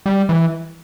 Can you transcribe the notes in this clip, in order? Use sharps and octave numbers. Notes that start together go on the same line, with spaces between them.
G3
E3